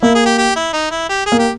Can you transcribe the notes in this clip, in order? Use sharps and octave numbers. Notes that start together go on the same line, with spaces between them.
A#3 E4
G#4
G4
G4
E4
D#4
E4
G4
G#4
A#3
G4